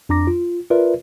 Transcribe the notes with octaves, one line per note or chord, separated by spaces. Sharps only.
F2 D4 A#5 D6 A#6
F4
F4 A#4 B4 D5 E5